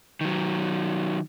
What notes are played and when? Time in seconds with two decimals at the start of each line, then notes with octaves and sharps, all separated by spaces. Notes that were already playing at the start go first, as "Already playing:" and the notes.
0.21 D#3 F#3